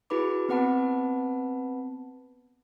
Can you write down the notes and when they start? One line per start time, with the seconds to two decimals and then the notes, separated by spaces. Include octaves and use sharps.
0.10 E4 F#4 G#4 B4 B5 D6
0.49 B3 C4 B4 F#5 A5 B5